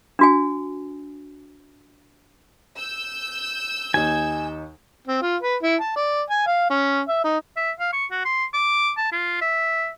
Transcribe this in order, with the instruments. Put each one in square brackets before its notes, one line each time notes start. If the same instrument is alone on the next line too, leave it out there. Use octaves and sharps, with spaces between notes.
[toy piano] D4 F#4 G#5
[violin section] E6 G6
[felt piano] D#2 D#4 [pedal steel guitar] G#5
[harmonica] C4
F4
B4
E4
A5
D5
G#5
F5
C#4
E5
D#4
[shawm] E5
F5
C#6
F#4
C6
D6
A5
F4
E5